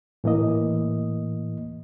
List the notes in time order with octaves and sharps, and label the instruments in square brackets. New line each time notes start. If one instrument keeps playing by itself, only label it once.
[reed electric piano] A2 E3 A#3 D#5